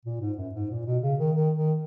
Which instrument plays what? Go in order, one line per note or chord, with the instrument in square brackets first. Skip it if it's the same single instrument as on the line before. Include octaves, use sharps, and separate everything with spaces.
[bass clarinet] A#2
G#2
F#2
G#2
A#2
B2
C#3
D#3
D#3
D#3